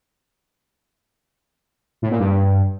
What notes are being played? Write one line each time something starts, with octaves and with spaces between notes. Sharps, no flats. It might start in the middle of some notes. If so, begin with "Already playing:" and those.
A2
A#2
G2